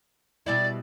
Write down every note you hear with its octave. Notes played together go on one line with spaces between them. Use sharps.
B2 G3 E4 D5